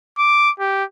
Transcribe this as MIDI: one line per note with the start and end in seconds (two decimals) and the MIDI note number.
0.18 0.51 86
0.60 0.84 67